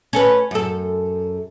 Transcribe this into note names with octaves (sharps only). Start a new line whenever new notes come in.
C#4 A4 B4
F#2 A4